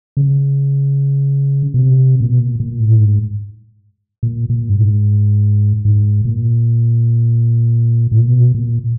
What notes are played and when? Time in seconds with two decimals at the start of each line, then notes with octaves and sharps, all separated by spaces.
0.17 C#3
1.74 B2
1.79 C3
2.20 A#2
2.29 B2
2.39 A#2
2.60 A#2
2.80 A2
3.01 G#2
4.23 A#2
4.50 A#2
4.69 G2
4.76 G#2
5.85 G#2
6.25 A#2
8.12 A2
8.19 A#2
8.28 B2
8.55 A#2